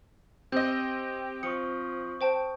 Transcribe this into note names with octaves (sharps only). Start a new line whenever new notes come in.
C4 G4 D#5 G6
F3 C#6 D#6 C#7
C5 G5 A5